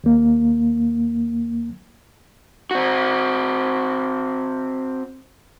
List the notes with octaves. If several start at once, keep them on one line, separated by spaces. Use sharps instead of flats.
D#2 A#3
C4 F#4